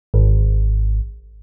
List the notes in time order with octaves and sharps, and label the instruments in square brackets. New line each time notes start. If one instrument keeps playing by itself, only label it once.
[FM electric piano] G#1